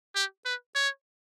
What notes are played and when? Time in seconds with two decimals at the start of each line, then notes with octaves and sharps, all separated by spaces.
0.15 G4
0.45 B4
0.75 C#5